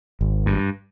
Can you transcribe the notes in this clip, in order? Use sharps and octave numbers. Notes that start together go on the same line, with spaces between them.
G#1
G2